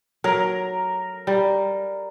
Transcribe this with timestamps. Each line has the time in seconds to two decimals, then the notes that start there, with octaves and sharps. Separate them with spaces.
0.24 F#3 A#4
1.27 G3